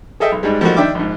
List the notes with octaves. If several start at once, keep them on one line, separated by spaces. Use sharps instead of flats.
G#4 A4 D#5 E5 G5
B1
G#2 G3 G#3
F3 G3 A3 A#3 D#4 F#4
D#3 D4 E5 G5 D6
A#1 G#2